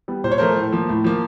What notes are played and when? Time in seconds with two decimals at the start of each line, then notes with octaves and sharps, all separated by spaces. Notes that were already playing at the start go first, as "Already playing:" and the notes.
0.08 G3 B3
0.24 A#2 C5
0.32 C#5
0.38 F3 A3 A#4 C5
0.56 A2
0.72 F3 A#3
0.89 A2
1.04 F3 A#3